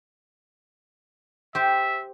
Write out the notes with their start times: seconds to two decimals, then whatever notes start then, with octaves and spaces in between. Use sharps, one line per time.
1.55 G4 C5 E5